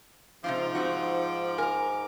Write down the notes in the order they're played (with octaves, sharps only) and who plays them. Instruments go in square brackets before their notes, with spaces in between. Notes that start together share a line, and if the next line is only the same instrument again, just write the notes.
[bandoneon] G#2 D6 [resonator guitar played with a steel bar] C3 D#4 F4 [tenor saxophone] F3
[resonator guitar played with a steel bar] C4 D#4 F#4
[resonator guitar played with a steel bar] A#4 A#5 [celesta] G#5